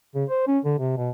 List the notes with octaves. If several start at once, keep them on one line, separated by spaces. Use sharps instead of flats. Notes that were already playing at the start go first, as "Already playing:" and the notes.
C#3
C5
C#4
D3
C3
B2